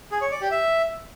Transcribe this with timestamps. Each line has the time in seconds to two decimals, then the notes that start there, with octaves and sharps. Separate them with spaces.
0.12 G#4
0.22 C#5
0.31 D5
0.41 G4
0.51 E5